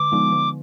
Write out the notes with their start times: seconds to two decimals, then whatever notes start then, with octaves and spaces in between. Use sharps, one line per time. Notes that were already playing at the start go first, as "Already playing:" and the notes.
Already playing: D3 D6
0.12 F3 G#3 B3 D#4
0.32 D3